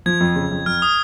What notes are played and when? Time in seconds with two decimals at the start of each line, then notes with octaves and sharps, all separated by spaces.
0.06 F3 G#6
0.20 F2
0.36 C#3
0.51 F2
0.66 F2 F6
0.82 D#6